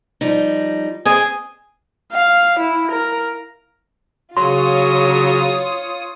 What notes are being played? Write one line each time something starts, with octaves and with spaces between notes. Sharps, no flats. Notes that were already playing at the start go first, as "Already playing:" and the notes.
F3 G3 D#4
C4 G#4
F5
E4
A#4
C#3 F#3 F4 C#5 C6 D#6